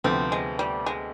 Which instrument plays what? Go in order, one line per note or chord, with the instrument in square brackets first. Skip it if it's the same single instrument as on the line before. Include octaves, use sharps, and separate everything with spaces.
[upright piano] D2 C3 F3 B3 [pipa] C4
[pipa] G#3
G3
G#3